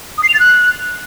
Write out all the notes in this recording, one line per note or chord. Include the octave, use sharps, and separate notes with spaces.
D#6
C7
F7
A6
F#6